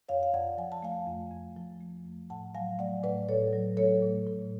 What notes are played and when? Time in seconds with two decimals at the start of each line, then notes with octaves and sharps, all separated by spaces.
0.09 F2 C#5 F5
0.23 F5
0.33 F2 D5 F#5
0.58 F3 G#5
0.72 A5
0.83 A3 F5 G#5
1.07 F2
1.31 F2
1.57 F3
1.81 A3
2.06 F2
2.30 A2 F#5 A5
2.55 F#3 F5 G#5
2.79 A3 D5 F#5
3.04 A2 B4 D5
3.29 A2 A4 C#5
3.53 F#3
3.77 A3 A4 C#5
4.02 A2
4.27 A2